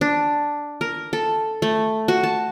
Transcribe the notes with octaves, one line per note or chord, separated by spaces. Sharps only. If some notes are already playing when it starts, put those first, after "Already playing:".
D4
A#4
A4
A3
F#4
A5